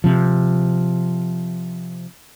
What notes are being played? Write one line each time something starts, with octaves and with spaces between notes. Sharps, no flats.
C3 F3